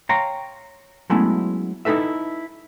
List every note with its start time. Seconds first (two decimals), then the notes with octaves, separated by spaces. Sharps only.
0.09 C#5 F5 G5 A#5 C6
1.10 F#3 G#3 A3 B3 C#4 E4
1.85 D#4 E4 A4 B4 E5